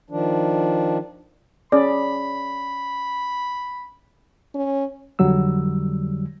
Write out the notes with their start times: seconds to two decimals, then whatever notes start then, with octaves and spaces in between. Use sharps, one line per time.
0.10 D#3 F3 D4
1.72 C#4 G#4 D5 B5
4.55 C#4
5.19 F2 D3 F#3 G3 E6